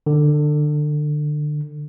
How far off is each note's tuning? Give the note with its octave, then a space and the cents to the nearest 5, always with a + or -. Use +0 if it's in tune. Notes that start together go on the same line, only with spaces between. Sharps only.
D3 +25